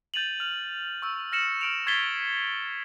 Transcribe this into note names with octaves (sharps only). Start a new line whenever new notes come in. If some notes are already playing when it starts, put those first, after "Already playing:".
G6 A6 D#7 F7 F#7
F6 F7
C#6 E6
F6 A#6 C#7 E7 F#7
F6 D7 F7
C#6 G#6 A6 B6 C7 G7